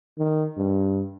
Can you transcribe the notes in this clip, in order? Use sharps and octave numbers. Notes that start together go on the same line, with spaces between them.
D#3
G2